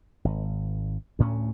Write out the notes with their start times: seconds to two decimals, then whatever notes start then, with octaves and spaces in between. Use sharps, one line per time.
0.25 G#1
1.19 D2 A2 A3 C#4